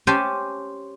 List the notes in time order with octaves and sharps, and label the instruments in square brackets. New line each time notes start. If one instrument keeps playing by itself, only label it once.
[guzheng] C#4 G4 C5 G#5 A5